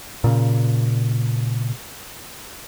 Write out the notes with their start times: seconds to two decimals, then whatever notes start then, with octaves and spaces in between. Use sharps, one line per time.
0.24 A#2 C#3